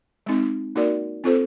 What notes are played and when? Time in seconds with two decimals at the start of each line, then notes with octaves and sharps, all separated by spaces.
0.26 G#3 C4 D#4
0.76 A#3 D#4 F#4 A#4 D5
1.24 C4 F4 A4 C5